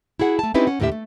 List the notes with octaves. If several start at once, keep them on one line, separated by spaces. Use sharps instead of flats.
E4 F#4 G#4 F#5
A3 A5
C4 C#4 D#4 E4 G4 B4
C#4 F#5
D#2 A2 D3 G4 E5
A3